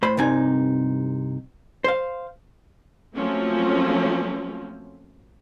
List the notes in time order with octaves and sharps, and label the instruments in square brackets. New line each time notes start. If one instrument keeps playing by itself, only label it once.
[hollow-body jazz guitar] A2 C5 B5
C2 G2 C3 D#4 G#5
C5 F5
[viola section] F3 F#3 A3 A#3 C4 C#4